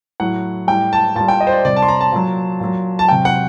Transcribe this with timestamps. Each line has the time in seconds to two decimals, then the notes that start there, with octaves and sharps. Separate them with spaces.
0.20 A2 F#3 F#5
0.67 A2 G3 G5
0.93 A5
1.16 A#2 G3 A5
1.28 G5
1.40 D#5
1.47 C5
1.52 D5
1.65 C3 G3 D5
1.76 A5
1.82 C6
1.88 A#5
2.01 A5
2.12 A#2 F#3
2.60 A#2 F#3
2.99 A5
3.09 C3 F#3 G5
3.25 F#5